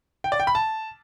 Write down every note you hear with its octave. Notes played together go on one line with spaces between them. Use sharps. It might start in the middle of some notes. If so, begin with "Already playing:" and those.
G5
D5
G5
B5
A5